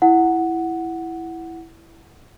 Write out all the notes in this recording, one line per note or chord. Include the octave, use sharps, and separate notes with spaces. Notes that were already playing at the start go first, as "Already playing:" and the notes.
E4 F#5